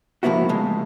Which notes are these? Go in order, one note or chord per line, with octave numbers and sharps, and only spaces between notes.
G#2 F3 A#3 B3 E4 F#4
C#2 A2 G#3